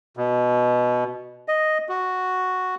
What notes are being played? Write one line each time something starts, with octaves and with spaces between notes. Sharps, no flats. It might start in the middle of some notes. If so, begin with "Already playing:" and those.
B2
D#5
F#4